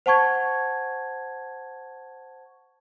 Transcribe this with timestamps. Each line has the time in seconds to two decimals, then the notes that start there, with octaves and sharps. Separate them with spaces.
0.06 C5 F#5 A5 C#6 G#6